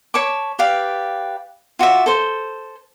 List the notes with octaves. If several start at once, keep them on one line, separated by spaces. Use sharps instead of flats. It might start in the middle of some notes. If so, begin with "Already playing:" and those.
C#5 A5 B5 D6
G4 B4 D5 F5
F4 F#4 D5 E5
A4 C5